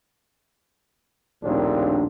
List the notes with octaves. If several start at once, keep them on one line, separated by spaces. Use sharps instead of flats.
A#1 D#2 A2 C4 D4